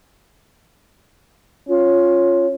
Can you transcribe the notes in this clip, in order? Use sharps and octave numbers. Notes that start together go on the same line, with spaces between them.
C#4 F4